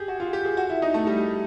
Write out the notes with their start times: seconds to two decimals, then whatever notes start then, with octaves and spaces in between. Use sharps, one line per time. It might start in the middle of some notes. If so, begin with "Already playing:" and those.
Already playing: G4 G#4
0.08 F#4
0.20 F4
0.33 G4
0.45 G#4
0.57 F#4
0.70 E4
0.82 D#4
0.94 A3
1.07 G3